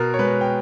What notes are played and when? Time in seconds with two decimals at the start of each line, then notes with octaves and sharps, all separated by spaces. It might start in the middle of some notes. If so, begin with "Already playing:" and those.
Already playing: B2 A#4
0.14 C#5
0.19 G#3 B4
0.41 G5